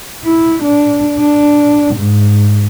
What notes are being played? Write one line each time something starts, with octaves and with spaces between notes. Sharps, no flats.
E4
D4
D4
G#2